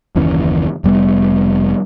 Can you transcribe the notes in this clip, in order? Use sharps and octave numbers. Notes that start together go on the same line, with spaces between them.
F#1 D#2 E3 C#4
F1 G3 B3